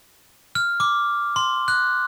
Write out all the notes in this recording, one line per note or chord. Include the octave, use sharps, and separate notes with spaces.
F6
D6
C6
F#6